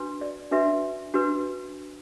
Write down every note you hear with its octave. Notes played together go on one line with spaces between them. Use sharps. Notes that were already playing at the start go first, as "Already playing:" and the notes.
Already playing: D4 F#4 B4
D5
D4 F#4 B4 E5
D4 F#4 B4